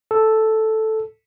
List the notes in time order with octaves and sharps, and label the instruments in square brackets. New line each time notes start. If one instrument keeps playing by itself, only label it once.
[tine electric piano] A4